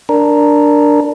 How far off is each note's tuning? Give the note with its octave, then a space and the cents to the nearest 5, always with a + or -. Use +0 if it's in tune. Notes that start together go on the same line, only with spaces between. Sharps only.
D4 +0 A#4 +0